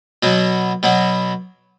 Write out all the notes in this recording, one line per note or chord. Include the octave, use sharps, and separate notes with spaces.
B2 F#3 B3
B2 F#3 B3